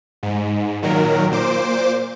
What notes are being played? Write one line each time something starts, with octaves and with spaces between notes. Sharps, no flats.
G#2
A#2 D#3 F#3 A#4
A#2 C5 D6